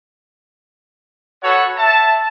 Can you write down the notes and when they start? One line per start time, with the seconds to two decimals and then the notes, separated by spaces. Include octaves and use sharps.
1.43 F#4 A4 B4 C#5 F#5
1.77 E5 A5